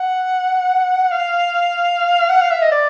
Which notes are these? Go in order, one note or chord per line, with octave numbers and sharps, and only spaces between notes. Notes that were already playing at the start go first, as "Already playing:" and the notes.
Already playing: F#5
F5
F#5
F5
E5
D#5
D5